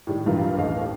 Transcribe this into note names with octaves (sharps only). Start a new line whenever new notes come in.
A2 D#3 G3
B1 G2 E3 F4 A#4
A1 D#2 A3 D#5 F5